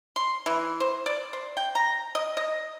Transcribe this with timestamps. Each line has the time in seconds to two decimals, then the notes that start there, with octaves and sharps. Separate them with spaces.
0.16 C6
0.46 E3
0.80 C5
1.06 D5
1.33 C5
1.57 G5
1.75 A#5
2.15 D#5
2.37 D#5